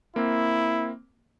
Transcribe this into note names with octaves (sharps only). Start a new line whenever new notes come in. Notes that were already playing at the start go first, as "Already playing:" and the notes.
A#3 C4 E4